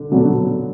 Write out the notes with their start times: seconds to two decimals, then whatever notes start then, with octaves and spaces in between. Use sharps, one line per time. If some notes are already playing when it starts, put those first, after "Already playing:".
Already playing: D3 D4
0.12 D3 F#3 B3 D4 A4